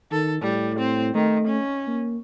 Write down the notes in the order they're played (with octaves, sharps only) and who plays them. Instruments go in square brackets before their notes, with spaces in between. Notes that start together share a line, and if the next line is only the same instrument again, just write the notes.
[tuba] D#3 [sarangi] A4
[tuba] A2 [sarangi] G3
[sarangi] C4
[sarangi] D#3 [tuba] A3
[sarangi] C#4
[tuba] A#3